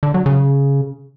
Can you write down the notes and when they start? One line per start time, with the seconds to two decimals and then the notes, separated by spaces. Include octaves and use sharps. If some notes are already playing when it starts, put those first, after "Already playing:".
0.03 D3
0.14 F#3
0.26 C#3